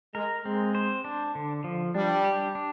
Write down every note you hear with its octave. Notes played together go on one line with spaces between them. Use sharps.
G#3 A#4
G#3 C4
C5
D4
D3
F3
G3 D4
G4
D4